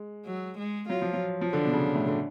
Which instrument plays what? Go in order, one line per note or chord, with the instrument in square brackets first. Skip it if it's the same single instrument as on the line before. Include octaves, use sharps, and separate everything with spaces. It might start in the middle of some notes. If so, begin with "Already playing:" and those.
Already playing: [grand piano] G#3
[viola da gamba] F#3
G#3
[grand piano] F#3 [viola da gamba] F4
[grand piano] F3
F#3
F3
[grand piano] D3 [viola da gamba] D4
[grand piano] B2
C#3
A2
D3